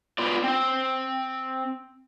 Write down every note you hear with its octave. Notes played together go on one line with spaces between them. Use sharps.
B3 F4 D5
C4